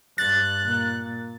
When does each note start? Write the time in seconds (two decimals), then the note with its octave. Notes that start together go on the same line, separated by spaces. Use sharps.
0.18 G2 F#6 A6
0.63 A#2